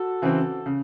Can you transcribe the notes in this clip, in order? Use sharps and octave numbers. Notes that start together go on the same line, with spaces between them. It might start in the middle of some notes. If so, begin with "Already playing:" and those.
Already playing: F#4 A4
C#3 E3 C4
C#3